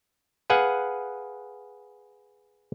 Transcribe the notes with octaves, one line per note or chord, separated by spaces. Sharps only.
G#4 B4 F5 F#5 G#5